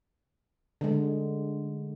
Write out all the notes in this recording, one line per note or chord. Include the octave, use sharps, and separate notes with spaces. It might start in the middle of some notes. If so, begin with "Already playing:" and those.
D3 G#3